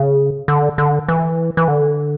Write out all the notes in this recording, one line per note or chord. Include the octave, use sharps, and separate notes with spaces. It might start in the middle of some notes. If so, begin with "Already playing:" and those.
Already playing: C#3
D3
D3
E3
E3
D3